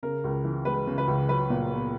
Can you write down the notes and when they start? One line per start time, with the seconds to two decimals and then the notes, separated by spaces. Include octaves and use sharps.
0.03 C#3 A#4
0.24 C#2
0.44 E3
0.65 G#3 B4
0.87 C#3
0.98 B4
1.08 C#2
1.29 F#3 B4
1.50 A#2
1.71 B3